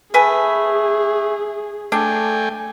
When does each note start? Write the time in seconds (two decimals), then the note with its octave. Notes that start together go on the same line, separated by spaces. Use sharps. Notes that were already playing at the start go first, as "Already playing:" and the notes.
0.14 A3 G#4 B4 G#5
1.92 A3 D4 G5 G#5